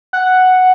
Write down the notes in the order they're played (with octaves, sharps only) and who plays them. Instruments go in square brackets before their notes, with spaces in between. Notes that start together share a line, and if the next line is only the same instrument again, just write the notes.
[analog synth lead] F#5